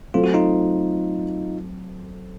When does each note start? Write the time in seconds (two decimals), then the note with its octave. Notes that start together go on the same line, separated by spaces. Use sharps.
0.14 F#3 A3 C4 F4
0.24 F#4
0.34 D#4 F4